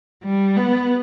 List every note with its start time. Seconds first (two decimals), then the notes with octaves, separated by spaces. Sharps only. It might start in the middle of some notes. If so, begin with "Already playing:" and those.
0.24 G3
0.56 B3